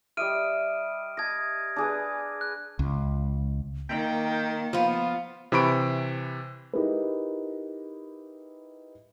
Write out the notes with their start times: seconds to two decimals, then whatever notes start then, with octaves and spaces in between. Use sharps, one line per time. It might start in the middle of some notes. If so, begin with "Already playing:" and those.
0.17 G3 D#5 E5 F6 D7 D#7
1.17 D#5 A5 G#6 A#6
1.76 D4 G#4 B4
2.41 F#6
2.79 C#2
3.89 D#3 A#3 G5
4.73 F3 B3 F4
5.52 C3 E3 C5 B5 C#6 D7
6.73 D#4 E4 G4 G#4 A#4 B4